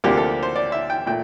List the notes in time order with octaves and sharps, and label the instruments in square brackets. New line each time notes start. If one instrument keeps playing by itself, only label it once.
[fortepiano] D2 C3 F3 A#3 D4 G4
A4
C5
D5
E5
G5
A#2 A3 G5